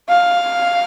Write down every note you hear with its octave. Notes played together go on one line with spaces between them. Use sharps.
F5